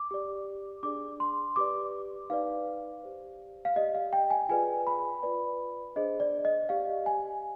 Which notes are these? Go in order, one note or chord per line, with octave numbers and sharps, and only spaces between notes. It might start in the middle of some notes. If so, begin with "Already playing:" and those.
Already playing: D6
G4 D5
D4 G#4 D5 D6
C6
G4 B4 D5 D6
D#4 B4 D5 F5
G4 C5
F5
G4 D5 D#5
F5
G5
G#5
F4 G#4 B4 D5 G#5
B5
F4 B4 D5
D4 G#4 C5 D#5
D5
D#5
G4 D5 F5
G#5